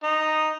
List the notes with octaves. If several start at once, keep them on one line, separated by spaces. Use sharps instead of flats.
D#4